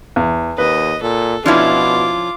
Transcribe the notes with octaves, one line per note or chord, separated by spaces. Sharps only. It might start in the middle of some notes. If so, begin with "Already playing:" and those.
E2
D#2 B4 D#5
A#2 A4
B2 F3 C#4 D4 E4 F4 D6